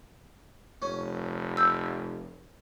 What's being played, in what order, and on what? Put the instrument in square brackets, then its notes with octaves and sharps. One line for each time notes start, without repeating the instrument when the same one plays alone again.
[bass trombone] F1 [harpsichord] C#4
[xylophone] E6 G6